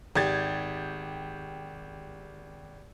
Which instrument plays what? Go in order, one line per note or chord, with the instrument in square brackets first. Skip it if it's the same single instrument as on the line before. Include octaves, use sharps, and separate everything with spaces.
[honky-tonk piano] G#1 G4 G#6 A6